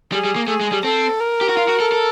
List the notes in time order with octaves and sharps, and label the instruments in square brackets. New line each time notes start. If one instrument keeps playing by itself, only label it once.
[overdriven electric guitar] G3 [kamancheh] G#4
[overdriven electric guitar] G3
A#3
[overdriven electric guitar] A3 [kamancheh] G#4
[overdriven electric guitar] G#3
G3
[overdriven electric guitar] C4 [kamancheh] A4
[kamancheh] A#4
[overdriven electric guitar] G4
F#4
F4
F#4
A4
A4